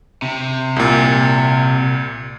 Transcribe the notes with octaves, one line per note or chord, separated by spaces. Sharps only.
C3
C2 A#2